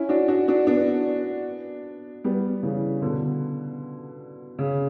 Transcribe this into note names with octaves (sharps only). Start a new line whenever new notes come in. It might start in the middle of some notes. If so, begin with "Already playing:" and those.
Already playing: C#4 E4
D4 F#4
D4 F#4
D4 F#4
B3 D4
G3 B3
C#3 E3
B2 D3
C#3